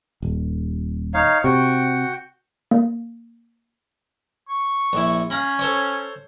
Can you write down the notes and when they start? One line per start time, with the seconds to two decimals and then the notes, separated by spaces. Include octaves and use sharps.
0.22 D#1
1.14 D#4 C#5 F5
1.44 C3 F#4 G5 C#6
2.71 A#3
4.49 C#6
4.93 A#1 E4
5.30 C#4 F5 A#5 B5
5.59 A4 C5 C#5